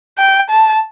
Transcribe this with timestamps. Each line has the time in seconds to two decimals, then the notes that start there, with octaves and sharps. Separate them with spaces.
0.18 G5
0.50 A5